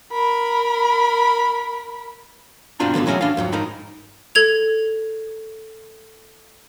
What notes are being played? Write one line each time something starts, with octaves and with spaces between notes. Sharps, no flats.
A#4 B5
G2 B2 C4 D4 F4 A#5
G2 B2 D3 F3 B3
E3 F#3 C#4 F#4 G#4 E5
D4 F5
F2 G#2 F#3
G#2 D#4 A#4 B5
A4 G#6 F7